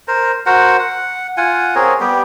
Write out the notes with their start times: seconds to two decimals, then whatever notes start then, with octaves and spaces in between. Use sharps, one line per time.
0.08 A#4 C5
0.46 F#4 A#4 C5 F#5
0.79 F#5
1.37 F4 F#5 G#5
1.75 C4 G#4 A#4 C#5
2.00 G3 B3 G4